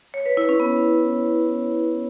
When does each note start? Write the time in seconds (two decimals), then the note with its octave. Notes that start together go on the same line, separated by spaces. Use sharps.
0.14 C#5
0.26 B4
0.37 E4
0.49 C#4
0.60 B3